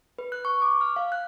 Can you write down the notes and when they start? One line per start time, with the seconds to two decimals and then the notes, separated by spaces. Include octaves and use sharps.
0.19 B4
0.32 F#6
0.45 C#6
0.62 D6
0.81 F6
0.96 F5
1.12 F#6